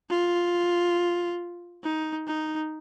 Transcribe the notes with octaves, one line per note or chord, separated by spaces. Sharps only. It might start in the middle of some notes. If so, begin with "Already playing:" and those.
F4
D#4
D#4